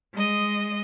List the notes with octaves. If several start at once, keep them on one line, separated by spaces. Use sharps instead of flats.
G#3 D#5